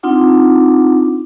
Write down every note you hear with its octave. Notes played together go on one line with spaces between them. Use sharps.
C4 D4 D#4 F4 F#5 D6